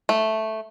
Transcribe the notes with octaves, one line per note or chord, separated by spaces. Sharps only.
A3